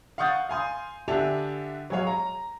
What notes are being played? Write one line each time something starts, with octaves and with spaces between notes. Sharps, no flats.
F5 F#5 C#6 D#6 G6 A6
F5 G#5 C6 D#6
D3 D4 G4 E5 G#5 F7
F#3 G#3 G#4 C#5 F5
A#5